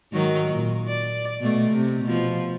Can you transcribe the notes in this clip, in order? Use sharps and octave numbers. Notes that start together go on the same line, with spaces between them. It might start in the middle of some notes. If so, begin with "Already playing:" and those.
G#2 D#3 F#3
A#2
D5
B2 A3
C3
B2 F3